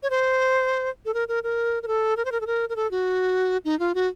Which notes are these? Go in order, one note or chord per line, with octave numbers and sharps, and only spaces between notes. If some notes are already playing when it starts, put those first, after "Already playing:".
C#5
C5
A4
A#4
A#4
A#4
A#4
A4
A#4
C5
A#4
A4
A#4
A#4
A4
F#4
D#4
F4
F#4